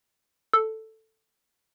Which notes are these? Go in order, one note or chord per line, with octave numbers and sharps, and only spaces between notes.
A4